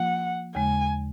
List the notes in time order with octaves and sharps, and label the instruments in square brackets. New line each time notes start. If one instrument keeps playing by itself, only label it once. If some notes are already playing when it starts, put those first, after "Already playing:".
Already playing: [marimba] F3 A#3 F4 [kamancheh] F#5
[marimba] D#2 C#3 G#3 [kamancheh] G#5